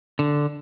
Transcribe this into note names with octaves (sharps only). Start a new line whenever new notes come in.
D3